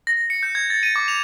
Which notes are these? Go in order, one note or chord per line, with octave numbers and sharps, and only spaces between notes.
A#6
C#7
G6
G#6
A6
D#7
D6
F7